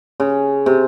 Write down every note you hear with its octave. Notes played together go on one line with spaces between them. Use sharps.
C#3
C3